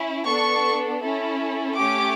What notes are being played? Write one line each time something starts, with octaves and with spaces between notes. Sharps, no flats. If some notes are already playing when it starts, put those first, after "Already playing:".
Already playing: C#4 E4
B3 D4 A4 C#6
C#4 E4 A4
A3 C#4 G4 D6